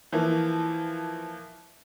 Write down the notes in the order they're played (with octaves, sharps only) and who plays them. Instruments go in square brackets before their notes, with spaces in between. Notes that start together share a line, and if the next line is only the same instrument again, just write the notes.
[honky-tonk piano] E3 F3 A#3